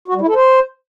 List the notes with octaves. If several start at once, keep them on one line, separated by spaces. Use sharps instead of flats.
F#4
G3
E4
A4
C5